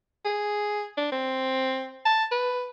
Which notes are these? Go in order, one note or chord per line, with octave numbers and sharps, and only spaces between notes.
G#4
D4
C4
A5
B4